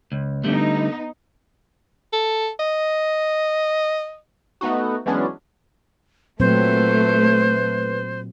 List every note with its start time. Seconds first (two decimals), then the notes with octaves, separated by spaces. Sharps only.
0.12 C#2
0.44 D3 G3 A3 B3 D#4
2.13 A4
2.60 D#5
4.61 A3 B3 D#4 F#4
5.06 E3 F#3 G#3 B3 C#4 D4
6.40 A#2 F#3 A3 C4 B4 C5